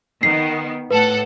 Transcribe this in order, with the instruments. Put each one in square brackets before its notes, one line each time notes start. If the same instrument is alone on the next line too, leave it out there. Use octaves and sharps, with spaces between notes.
[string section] D#3 B3 [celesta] C7
[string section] A2 A4 F#5 [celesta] B4